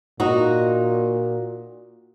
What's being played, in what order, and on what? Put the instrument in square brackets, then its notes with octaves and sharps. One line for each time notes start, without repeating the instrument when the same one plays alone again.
[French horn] A#2 [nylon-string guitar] D#4 F#4